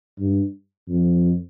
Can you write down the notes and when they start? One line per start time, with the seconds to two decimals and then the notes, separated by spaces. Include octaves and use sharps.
0.19 G2
0.89 F2